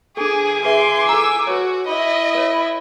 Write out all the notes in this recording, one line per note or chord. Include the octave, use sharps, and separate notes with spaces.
D4 G#4 A4 G#5 D6
G#4 B4 E5 C6
A4 A#5 E6
F#4 B4 C#5
E4 D#5 B5
B4 C#5